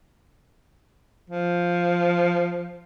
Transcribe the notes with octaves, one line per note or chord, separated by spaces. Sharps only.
F3